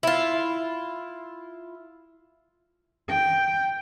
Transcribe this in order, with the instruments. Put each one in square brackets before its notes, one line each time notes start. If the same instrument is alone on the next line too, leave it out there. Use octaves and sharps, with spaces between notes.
[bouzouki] E4 F4
[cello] G5